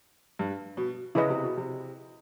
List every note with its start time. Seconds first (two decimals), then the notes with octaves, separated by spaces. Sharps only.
0.39 G2
0.77 B2
1.15 C#3 E4 G#4 B4 D#5
1.30 C3
1.43 B2
1.57 C3